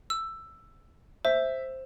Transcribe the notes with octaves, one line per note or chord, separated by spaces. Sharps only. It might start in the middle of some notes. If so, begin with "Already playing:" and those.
E6
C5 E5